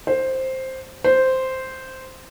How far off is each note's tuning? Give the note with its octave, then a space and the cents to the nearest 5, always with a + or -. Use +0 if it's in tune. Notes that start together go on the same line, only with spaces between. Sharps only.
C5 +5
C5 -5